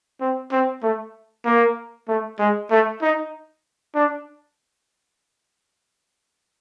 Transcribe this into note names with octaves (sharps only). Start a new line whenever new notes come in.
C4
C4
A3
A#3
A3
G#3
A3
D#4
D4